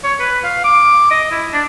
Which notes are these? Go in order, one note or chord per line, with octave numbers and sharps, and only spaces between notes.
C#5
B4
F5
D6
D#5
E4
D4